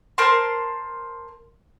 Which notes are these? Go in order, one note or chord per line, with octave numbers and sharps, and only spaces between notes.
A#4 C5 A5 C6